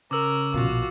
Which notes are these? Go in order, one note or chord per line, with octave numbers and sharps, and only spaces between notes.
C#3 A#4 D6 E6
A#1 B2 F4 F#4